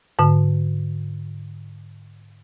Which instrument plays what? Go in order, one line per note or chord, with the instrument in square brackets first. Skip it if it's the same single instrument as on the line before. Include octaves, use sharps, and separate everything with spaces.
[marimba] G#2 D3